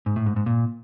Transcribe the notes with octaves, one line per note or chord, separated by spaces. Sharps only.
G#2
A2
G#2
G#2
A#2